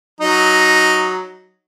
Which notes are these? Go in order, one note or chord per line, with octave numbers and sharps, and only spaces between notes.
F#3 D#4